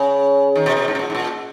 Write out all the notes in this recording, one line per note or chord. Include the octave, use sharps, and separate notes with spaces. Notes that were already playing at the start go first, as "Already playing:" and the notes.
Already playing: C#3
D#3
B2
B2
G#2
B2
A#2
G#2
A#2